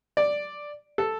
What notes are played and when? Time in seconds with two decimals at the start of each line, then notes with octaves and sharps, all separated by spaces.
0.17 D5
0.98 A4